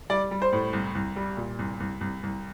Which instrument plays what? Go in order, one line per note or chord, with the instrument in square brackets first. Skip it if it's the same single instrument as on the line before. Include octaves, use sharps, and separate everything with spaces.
[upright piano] G3 D5
G3
C5
A2
C2
C2
G3
A#2
C2
C2
C2
C2